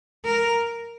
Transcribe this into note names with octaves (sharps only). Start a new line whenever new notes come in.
A#4